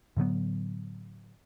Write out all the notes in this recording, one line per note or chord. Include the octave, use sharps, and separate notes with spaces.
A2 D3 F#3 B3